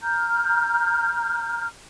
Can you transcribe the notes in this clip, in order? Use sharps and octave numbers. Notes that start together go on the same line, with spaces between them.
A#5 F6 G6